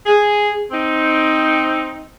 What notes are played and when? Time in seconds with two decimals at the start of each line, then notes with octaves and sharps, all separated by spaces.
0.06 G#4
0.71 C4 D#4